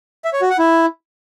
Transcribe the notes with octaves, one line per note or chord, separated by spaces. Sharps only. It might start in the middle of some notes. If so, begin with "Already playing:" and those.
E5
C#5
F#4
F#5
E4